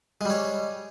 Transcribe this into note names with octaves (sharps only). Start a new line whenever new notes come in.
G3 G#3 C#5